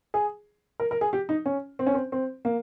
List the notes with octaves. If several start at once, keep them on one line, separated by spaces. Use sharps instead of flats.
G#4
A#4
A#4
G#4
G4
D#4
C#4
C4
C#4
C4
C4
A#3